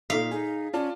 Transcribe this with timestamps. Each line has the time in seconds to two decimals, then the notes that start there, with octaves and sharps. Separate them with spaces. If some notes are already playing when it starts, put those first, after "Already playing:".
0.10 A#2 D#4 F5 B6
0.31 D#4 G#4
0.73 C#4 F4 D5 A5